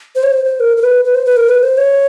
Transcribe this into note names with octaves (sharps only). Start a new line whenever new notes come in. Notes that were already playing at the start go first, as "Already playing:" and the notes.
C5
C#5
C5
C5
A#4
A#4
B4
B4
C5
B4
A#4
B4
C5
C#5